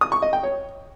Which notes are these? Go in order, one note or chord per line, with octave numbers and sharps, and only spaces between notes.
D#6
C#6
D#5
G5
C#5